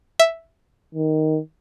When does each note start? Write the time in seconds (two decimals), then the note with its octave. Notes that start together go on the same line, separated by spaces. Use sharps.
0.19 E5
0.94 D#3